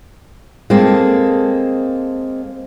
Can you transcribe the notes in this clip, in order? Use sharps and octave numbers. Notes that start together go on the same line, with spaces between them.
G#3 A#3 C4 A4